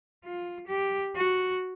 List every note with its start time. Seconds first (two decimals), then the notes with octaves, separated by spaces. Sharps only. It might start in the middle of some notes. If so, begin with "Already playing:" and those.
0.25 F4
0.67 G4
1.16 F#4